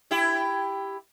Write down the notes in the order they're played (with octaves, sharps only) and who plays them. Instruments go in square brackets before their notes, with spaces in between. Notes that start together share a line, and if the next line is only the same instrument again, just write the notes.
[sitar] E4 G4